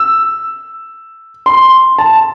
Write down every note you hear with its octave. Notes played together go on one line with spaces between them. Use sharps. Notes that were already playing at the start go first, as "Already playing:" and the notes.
Already playing: E6
C6
A5